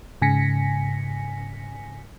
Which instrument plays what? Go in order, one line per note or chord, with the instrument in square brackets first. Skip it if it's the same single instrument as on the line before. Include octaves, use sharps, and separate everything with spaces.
[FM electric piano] G#2 C#3 G#5 A#6 B6 C#7